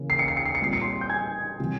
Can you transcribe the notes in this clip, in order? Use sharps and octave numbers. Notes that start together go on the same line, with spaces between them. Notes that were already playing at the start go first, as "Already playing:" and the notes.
Already playing: C#3 E3 A#3 C#4
C7
C#7
C7
C#7
C7
C#7
A#2 G3 C4 C7
C#7
C6 C7
G6
G#5 G#6
C3 E3 G3 C4